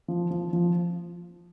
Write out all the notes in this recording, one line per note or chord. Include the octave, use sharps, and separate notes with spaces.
F3
F3
F3